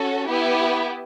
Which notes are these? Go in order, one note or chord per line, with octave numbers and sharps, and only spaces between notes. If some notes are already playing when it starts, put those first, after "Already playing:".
Already playing: C#4 F#4 A4
B3 E4 G4